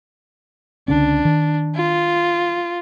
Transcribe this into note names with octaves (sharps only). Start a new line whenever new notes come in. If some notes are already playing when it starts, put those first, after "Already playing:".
C#2 D3 C#4 D4
D#3
F4